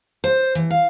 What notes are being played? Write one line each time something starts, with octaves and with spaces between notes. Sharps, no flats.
C5
E3
F5